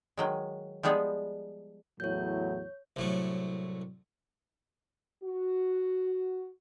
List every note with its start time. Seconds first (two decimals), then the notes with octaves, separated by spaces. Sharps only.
0.17 D#3 F#3 G#3
0.83 F3 G3 G#3 B3 G#4
2.00 E2 A2 F#3 C#5 G6
2.96 C2 A2 F#3
5.24 F#4